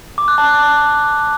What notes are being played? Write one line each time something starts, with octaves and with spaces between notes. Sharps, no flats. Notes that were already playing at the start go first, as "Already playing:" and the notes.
D6
F#6
A5
D6